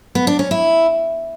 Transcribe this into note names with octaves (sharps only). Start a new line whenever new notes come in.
B3
D4
C#4
E4